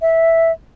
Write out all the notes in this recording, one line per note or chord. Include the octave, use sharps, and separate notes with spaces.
E5